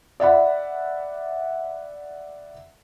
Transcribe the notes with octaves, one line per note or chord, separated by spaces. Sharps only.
D5 E5 F#5 B5